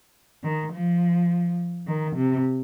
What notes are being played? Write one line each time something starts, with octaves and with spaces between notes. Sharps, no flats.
D#3
F3
D#3
C3